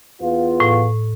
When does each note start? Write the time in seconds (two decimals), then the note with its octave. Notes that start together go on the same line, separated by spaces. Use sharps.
0.22 E2 B3 F4
0.60 A2